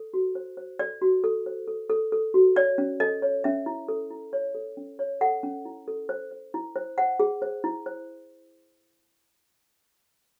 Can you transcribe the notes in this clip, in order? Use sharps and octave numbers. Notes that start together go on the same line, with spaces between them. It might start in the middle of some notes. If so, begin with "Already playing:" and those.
Already playing: A4
F#4
C5
C5
A4 D5
F#4
A4
C5
A4
A4
A4
F#4
C#5 D5
C#4
A4 D#5
C#5
C#4 E5
E4
A4
E4
C#5
A4
C#4
C#5
A4 F#5
C#4
E4
A4
C5
C5
E4
C5
C5 F#5
G#4
C5
E4
C5